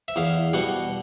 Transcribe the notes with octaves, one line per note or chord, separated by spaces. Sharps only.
E5
E2 F5
B2 G3 F#5